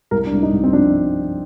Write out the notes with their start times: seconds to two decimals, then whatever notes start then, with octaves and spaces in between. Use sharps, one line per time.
0.11 C2 A#4
0.27 D4
0.33 C2
0.42 D#4
0.52 C2
0.64 C4
0.73 F3 D4